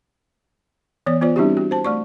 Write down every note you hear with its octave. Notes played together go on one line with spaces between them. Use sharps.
E3 B3 C#5 D5
B3 F4 C5 D5
G3 C4 D4 E4 F#4 G4
F#4
C5 A5
A3 D5 C#6